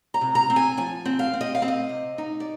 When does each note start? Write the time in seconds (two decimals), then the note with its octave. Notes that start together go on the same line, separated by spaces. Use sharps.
0.14 A#5
0.21 C3
0.35 A#5
0.50 C4
0.56 G#5
0.77 F3 G#5
1.05 C4
1.19 F5
1.34 C4
1.41 D#5
1.55 F5
1.62 C4
1.68 D#5
1.89 C3
2.18 D#4
2.40 D5